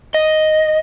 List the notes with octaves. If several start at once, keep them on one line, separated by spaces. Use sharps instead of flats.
D#5